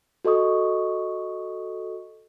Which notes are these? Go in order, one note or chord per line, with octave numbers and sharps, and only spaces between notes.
F#4 A4 D#5 C#6 D#6